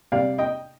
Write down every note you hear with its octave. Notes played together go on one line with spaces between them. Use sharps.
C3 G3 D5 F5
D#5 G5